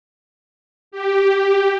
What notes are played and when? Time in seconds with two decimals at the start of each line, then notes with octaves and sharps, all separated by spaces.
0.92 G4